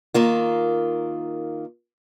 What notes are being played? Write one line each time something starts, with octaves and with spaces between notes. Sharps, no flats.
D#3 A#3 F4